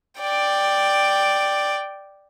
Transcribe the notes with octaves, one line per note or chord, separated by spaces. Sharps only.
D5 G5